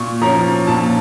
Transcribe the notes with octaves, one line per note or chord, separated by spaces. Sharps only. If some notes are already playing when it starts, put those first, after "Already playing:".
Already playing: A#2 C#6
F3 C#4 A#5
A#2 A5